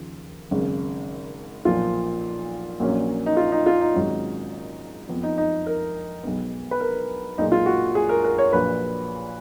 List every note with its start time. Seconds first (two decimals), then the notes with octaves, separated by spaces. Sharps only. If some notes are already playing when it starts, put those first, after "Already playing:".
Already playing: D#2 C#3 F3
0.51 G#1 F#2 C#3
1.65 B1 A#2 F3 F4
2.80 A#1 A#2 F#3 A#3 C#4
3.26 D#4
3.37 F4
3.52 D#4
3.66 F4
3.81 D#4
3.94 G#1 G#2 F#3 C#4
5.09 F2 F3 B3
5.23 D#4
5.38 D#4
5.67 A#4
6.23 B1 B2 G#3 B3
6.71 B4
6.80 A#4
7.38 B1 A#2 G#3 D#4
7.52 F4
7.66 F#4
7.95 G#4
8.09 A#4
8.24 A#4
8.38 C#5
8.53 A#1 A#2 F#3 B4